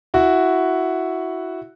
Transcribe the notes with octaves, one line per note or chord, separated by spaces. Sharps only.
E4 F#4